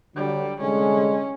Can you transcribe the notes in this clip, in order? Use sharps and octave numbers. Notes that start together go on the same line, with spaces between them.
D3 F#3 G3
C2 D3 G#3 C#4